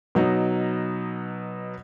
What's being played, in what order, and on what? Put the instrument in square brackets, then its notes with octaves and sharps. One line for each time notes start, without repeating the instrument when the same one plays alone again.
[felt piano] B2 F#3 D#4